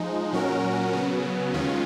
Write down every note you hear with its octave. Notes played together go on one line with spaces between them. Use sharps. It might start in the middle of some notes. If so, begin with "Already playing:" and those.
Already playing: F3 G#3 D#4
A#2 F#3 C#4 F#4 A#4
C#3 F#3 B3
D#2 D#3 G#3 C#4 F4